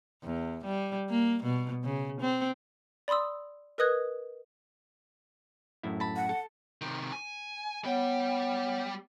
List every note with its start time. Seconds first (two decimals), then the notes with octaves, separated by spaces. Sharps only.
0.24 E2
0.65 G3
1.09 A#3
1.44 B2
1.84 C#3
2.21 C4
3.08 D5 B5 C6 D#6 E6
3.78 A#4 B4 D#5 D#6 F#6 G#6
5.83 F#2 A2 E4
6.00 A5 B5
6.16 F#5
6.29 A4
6.81 C3 D#3
7.12 G#5
7.84 G3 B3 C#5 F#5 G5